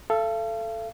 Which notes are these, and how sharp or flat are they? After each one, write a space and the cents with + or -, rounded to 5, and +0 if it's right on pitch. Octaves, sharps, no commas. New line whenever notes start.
A4 +0 F5 -45